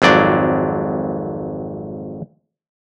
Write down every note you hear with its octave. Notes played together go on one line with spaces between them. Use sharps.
G#1 F2 F#3 D5